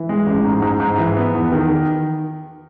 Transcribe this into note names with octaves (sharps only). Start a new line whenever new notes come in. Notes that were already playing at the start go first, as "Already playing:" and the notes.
Already playing: E3
G#3
A1
G#2
G#2
G#2
E3
B3
E2
D#3